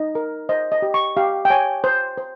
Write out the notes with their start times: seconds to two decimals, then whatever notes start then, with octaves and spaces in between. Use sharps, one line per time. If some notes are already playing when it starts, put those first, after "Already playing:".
Already playing: D#4 D#5
0.15 A#4
0.49 C5 D#5
0.72 D#5
0.82 G4
0.94 C#6
1.17 G4 F5
1.45 G5
1.50 C#5 G#5
1.84 C5
2.18 C5